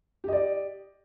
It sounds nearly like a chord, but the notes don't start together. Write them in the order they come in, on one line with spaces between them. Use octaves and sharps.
G4 D#5 D5